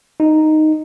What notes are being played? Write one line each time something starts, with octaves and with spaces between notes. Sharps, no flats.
D#4